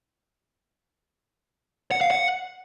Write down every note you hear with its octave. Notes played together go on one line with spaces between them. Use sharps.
F#5
F5
F#5